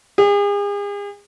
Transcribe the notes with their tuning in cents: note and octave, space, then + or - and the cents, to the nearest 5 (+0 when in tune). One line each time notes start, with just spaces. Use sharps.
G#4 -40